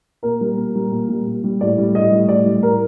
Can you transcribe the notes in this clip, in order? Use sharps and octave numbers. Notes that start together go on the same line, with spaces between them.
A#2 A#4
G3
A#2
G3
A#2
G3
A#2
G3
A2 D5
G3
A2 D#5
G3
A2 D5
G3
A2 A#4